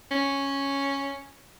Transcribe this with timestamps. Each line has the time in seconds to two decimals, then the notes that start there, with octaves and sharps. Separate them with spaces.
0.11 C#4